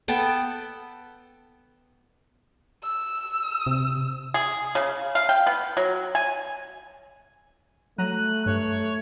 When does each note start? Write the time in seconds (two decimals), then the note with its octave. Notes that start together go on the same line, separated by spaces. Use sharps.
0.08 B3 A4 G5
2.83 E6
3.67 C3
4.34 G#4
4.75 C#3
5.15 F5
5.29 G5
5.47 B3
5.77 F#3
6.15 G#5
7.98 F#3 A3 A#5 F#6 D#7
8.46 G2 C#5